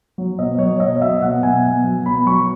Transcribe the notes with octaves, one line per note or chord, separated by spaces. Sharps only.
F#3
B2 D#5
F#3 C#5
B2 D#5
F#3 E5
B2 F#5
B2 G#5
B2
F#3
B2 B5
F#3 C#6